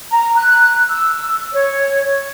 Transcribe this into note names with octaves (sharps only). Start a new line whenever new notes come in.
A#5
F#6
E6
C#5